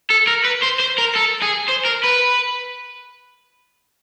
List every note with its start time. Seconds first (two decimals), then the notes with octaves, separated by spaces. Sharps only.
0.10 A4
0.27 A#4
0.45 B4
0.63 C5
0.80 C5
0.98 A#4
1.15 A4
1.42 G#4
1.68 C5
1.85 A#4
2.03 B4